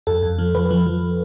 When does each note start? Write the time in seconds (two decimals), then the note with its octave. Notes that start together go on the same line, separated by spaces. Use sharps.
0.07 F2 A4
0.23 F2
0.39 F3
0.55 F3 B4
0.71 F3
0.86 F3